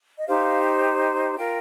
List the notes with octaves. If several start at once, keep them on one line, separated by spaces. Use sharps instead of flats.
D#5
D#4 G4 C5 F5
F4 A#4 G5